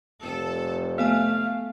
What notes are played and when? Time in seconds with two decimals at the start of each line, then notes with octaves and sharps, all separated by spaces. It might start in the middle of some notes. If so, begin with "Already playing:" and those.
0.22 F1 A4
0.98 A3 B3 A4 F5 G#5